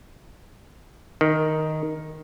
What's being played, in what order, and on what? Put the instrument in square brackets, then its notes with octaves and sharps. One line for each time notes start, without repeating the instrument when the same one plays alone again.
[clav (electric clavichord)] D#3